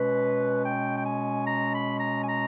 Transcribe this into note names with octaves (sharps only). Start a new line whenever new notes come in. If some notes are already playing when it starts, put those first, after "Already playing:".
Already playing: B2 G#3 C#4 B4
G5
G5
G#5
A#5
B5
A#5
G#5
A#5